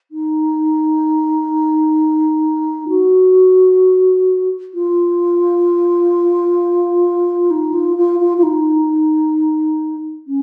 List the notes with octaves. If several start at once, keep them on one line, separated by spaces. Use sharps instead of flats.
D#4
F#4
F4
D#4
F4
F4
F4
F4
D#4
C#4